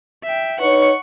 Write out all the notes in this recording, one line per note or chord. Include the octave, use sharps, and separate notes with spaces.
E5 G5
D#4 B4 C#5 F#5 C#6